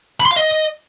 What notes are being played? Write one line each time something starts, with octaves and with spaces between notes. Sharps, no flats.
B5
C6
F5
D#5